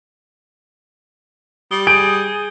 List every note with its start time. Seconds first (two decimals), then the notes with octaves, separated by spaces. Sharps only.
1.71 G3 D#6 G7
1.87 G#4 G6 D7